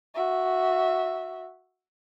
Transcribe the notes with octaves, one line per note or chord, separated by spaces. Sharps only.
F#4 E5